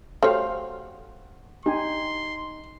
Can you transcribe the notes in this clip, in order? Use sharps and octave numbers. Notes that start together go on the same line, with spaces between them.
A3 F#4 G4 C5 C#5 F5
D#4 G4 G#5 C6